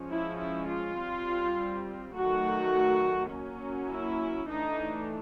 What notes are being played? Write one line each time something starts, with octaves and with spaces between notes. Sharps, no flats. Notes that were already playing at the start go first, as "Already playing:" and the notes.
Already playing: F3 G#3 C#4
E4
E4
F4
G3 C4
D#3 F#3 A3 F#4
F#3 A#3 C#4
E4
E3 A3 D4 D#4